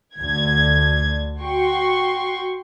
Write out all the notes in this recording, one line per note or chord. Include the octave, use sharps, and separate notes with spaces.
D2 D3 G#6
F#4 G5 C6 C#6